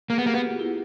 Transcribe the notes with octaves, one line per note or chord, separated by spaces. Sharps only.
A#3 G#4
B3
G4
A#3
B3 F#4
F4
E4